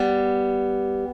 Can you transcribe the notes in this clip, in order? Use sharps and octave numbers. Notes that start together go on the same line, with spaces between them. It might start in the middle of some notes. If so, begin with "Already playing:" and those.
Already playing: G3 B3